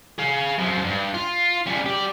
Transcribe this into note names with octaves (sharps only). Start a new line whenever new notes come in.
G#4 F5
F#2 F3
G2
F4
C#3 G3
G4 D5